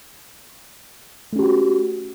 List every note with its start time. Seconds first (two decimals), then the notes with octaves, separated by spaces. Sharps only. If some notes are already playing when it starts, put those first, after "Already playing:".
1.33 A3
1.36 C#4
1.39 G4
1.42 F#4